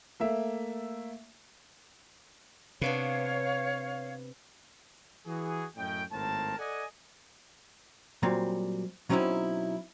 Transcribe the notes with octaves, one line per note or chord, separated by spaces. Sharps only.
A3 A#3 E5
C3 B3 D4 B4 C#5 F5
E3 F#4 G#4
F#2 A2 C#4 D#5 G5
G#1 A2 A#4 C5 A5
A4 D5 D#5 F#5 G#5
A#2 F#3 G3 C4
B2 F#3 C4 C#4 D#4 E4